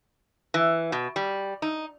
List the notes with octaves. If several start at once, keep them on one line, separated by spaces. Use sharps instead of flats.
E3
B2
G3
D#4